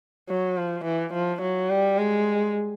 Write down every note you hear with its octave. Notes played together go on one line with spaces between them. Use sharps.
F#3
F3
E3
F3
F#3
G3
G#3